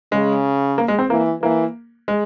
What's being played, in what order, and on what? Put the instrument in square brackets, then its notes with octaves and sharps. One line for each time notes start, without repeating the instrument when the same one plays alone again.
[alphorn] C#3 [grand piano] G#3
[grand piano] A#3
G#3
C4
[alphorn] E3 [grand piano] A#3
[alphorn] E3 [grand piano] A#3
[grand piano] G#3